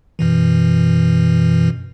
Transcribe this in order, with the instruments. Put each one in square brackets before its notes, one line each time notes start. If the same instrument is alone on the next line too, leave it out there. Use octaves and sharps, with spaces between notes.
[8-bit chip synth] F#2 B2 E3